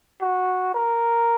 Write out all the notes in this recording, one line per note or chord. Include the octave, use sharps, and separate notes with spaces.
F#4
A#4